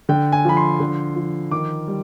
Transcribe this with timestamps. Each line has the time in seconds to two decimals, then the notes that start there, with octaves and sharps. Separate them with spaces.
0.09 D3 G5
0.32 G#5
0.45 F3 B5
0.57 C6
0.80 D3
1.16 F3
1.51 D#3 D6
1.88 G3